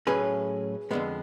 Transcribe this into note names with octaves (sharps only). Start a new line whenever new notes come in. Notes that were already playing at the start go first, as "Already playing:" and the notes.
A2 F#3 A3 C#4 G#4 B4
F2 D3 G#3 B3